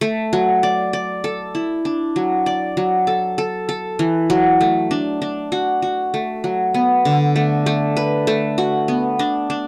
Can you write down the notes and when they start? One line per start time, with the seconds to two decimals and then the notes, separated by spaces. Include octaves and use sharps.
0.01 A3
0.33 F#3
0.63 D5
0.93 D5
1.24 A4
1.55 E4
1.85 D4
2.16 F#3
2.46 D5
2.77 F#3
3.07 A4
3.38 A4
3.69 A4
3.99 E3
4.30 F#3
4.61 A3
4.91 D4
5.22 D4
5.52 F#4
5.82 F#4
6.14 A3
6.44 F#3
6.74 B3
7.05 D3
7.36 A3
7.66 A3
7.97 B4
8.27 A3
8.58 F#4
8.88 B3
9.19 D4
9.50 D4